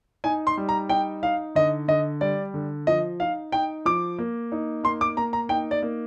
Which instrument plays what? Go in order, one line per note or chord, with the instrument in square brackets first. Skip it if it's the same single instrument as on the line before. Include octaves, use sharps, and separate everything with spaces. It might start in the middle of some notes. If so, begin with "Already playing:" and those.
[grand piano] D#4 G#5
C6
G3
A#5
D#4 G5
D#4 F5
D3 D#5
D3 D#5
G3 D5
D3
F3 D#5
D#4 F5
D#4 G5
F3 D6
A#3
D#4
A#3 C6
D6
A#3 A#5
A#5
D#4 G5
D5
A#3